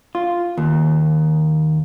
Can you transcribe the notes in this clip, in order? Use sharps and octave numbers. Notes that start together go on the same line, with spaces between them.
F4
D#2